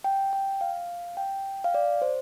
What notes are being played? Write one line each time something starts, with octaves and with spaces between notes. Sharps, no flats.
G5
G5
F5
G5
F5
D5
C5